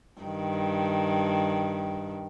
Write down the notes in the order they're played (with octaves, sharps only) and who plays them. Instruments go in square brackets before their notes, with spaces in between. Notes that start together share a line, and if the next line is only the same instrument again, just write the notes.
[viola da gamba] G2 D#3